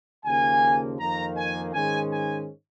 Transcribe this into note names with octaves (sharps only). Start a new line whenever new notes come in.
D#2 C#3 F3 A#3 G#5
F2 D#3 A#3 A#5
G#5
G#2 D#3 G#3 C#4 G#5
G#5